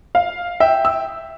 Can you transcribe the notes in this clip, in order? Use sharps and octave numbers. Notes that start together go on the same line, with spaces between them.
F5
E5 G5
E6